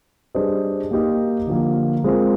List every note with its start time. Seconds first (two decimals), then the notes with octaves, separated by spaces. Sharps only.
0.35 G3 D4 G#4 C5 D#5
0.91 A#3 D#4 G4 A#4 D#5
1.47 D3 F3 A#3
2.04 G#3 C4 F4 A#4